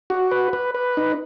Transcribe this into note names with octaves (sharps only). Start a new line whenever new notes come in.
F#4
B4
B4
B4
D#4